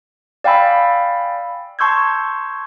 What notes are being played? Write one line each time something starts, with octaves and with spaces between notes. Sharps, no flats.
D5 F5 G5 G#5 B5 E6
A5 C6 C#6 E6 G6 G#6